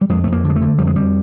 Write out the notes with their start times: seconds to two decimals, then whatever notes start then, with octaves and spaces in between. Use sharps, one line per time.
0.01 G3
0.09 F2 G#3
0.24 F2 A3
0.32 A#3
0.44 D3
0.50 G#3
0.56 A3
0.61 D3
0.78 F2 G3
0.87 G#3
0.96 F2 G3